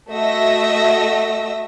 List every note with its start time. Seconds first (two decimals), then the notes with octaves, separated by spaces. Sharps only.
0.11 A3 F#4 D#5 E5 E6 A#6